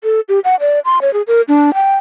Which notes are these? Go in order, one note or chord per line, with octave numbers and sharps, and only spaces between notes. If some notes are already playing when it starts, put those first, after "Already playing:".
A4
G4
F#5
D5
C6
C#5
G#4
A#4
D4
G5